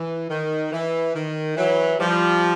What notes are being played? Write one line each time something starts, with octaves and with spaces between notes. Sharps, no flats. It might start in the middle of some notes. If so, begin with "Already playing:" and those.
Already playing: E3
D#3
E3
D#3
E3 F#3
F3 G3